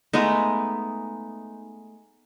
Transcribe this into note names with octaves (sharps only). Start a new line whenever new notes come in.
G#3 A3 B3 D#4